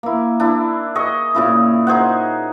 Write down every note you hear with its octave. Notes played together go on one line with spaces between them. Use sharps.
A#3 E4
D4 E4
G#4 D#5 C#6
A#2 C#3 E4
D#4 G#4 C5 F#5